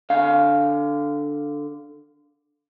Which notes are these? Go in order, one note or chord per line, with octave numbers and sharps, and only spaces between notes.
D3 F5